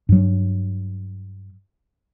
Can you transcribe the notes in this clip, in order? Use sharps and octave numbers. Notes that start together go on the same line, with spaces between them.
G2 F#3